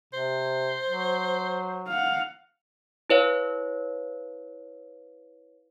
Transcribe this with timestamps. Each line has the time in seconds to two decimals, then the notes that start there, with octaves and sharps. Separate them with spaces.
0.14 C3 C5
0.89 F#3
1.88 F5 F#5
3.10 E4 B4 C#5 F5